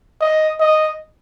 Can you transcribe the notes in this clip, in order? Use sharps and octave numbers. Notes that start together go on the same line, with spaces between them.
D#5
D#5